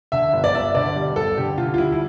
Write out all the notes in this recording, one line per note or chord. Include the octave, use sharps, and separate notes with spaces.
D3 E5
G1
D5
G1 E5
D3 D5
G3
G1 A4
D3 G4
D3 F4
F4
G3 E4
E4